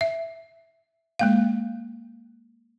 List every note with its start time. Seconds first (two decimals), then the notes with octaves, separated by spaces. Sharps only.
0.01 E5
1.19 G#3 A#3 F5